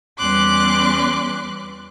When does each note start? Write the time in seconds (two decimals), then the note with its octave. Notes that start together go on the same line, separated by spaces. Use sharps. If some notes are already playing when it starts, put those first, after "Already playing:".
0.18 E2 G3 C#4 C6 D6 F#6